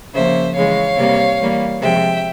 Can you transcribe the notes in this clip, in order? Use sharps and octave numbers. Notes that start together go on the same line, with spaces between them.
C#3 F3 A#3 C5 E5
C#3 E3 G#3 C#5 F5
C3 G3 A#3
E3 G3 A#3
C3 F3 G#3 E5 G5